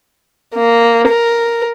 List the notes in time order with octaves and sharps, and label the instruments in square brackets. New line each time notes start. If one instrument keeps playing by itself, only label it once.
[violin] A#3
A#4